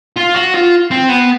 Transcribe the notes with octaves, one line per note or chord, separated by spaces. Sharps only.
F4
F#4
F4
C4
B3